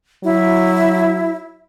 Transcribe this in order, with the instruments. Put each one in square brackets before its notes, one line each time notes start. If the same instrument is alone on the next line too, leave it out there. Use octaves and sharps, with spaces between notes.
[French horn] F#3 [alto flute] E4